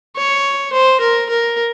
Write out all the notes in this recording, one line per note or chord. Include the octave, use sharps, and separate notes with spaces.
C#5
C5
A#4
A#4